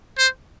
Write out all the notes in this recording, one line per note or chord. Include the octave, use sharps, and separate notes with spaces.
C5